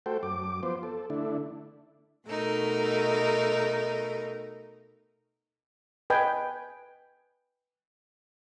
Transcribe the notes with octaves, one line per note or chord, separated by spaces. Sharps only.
A3 F#4 A4 C5 G5
F#2 D6
F3 B3 C5
A4
D3 A3 D4 E4
B2 A3 D#4 A#4
B4 D#5 G5 G#5